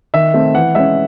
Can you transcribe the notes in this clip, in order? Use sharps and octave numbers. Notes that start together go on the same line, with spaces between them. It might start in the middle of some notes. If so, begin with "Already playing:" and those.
D#3 E5
A3 C4
E3 F#5
G#3 C#4 E5